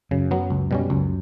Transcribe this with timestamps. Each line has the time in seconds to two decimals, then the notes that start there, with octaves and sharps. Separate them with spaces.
0.11 F#2 C#3
0.31 F#3 B3
0.50 C#2
0.71 B2 G3 C#4
0.90 C#2 F#2